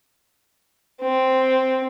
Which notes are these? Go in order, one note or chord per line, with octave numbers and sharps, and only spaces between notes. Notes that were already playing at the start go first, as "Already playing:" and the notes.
C4